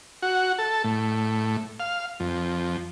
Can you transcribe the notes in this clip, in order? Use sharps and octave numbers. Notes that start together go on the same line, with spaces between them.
F#4
A4
A2
F5
F2